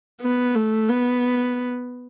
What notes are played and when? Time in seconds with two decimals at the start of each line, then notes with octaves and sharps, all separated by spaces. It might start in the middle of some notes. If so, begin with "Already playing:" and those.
0.22 B3
0.55 A3
0.89 B3